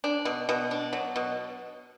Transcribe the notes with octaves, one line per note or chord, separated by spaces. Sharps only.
D4
B2
B2
D4
F#3
B2